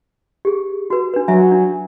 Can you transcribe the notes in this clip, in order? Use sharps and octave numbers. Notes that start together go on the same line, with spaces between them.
G4 G#4
F#4 B4
D4 B4
F#3 E5 G#5 A#5
D4